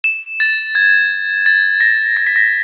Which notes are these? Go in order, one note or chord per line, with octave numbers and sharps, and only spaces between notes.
E7
A6
G#6
A6
A#6
A#6
B6
A#6